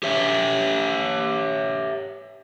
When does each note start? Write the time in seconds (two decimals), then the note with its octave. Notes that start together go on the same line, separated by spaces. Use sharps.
0.03 G4 C#5 E5